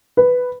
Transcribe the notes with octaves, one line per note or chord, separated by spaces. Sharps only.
B4